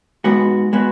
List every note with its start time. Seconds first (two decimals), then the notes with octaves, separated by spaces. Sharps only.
0.24 G#2 G#3 B3 F#4
0.73 G#3 B3 F#4